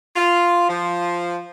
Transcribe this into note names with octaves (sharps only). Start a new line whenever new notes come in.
F4
F3